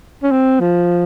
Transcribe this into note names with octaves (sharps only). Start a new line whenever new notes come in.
C#4
C4
F3